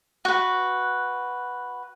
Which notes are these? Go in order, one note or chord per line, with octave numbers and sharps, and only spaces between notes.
F#4 B4